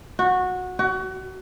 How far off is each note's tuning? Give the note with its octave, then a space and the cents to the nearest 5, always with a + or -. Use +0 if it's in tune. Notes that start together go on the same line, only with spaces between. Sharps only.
F#4 -15
F#4 +30